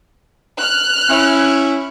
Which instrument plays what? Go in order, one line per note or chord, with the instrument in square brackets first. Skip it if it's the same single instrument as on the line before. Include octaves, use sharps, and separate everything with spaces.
[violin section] F6 F#6
[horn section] C#4 E4